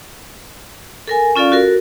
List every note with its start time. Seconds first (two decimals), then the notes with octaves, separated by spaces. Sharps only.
1.08 A4 A#4 G#5
1.36 C#4 F4 A4 D5 F5
1.52 F#4 A4 A#4